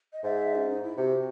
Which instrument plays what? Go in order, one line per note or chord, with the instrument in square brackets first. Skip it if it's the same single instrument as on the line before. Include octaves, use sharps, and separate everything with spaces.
[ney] D#5
[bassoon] G#2 [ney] E5
[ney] C#4
D#4
E4
[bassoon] C3 [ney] F#4